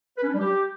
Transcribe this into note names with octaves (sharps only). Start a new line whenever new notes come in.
B4
C#4
D4
G3
G4